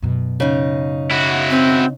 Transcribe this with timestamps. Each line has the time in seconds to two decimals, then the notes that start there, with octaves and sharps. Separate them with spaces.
0.02 F#2 B2
0.40 C#3 D#4
1.11 E4 F#4
1.50 C4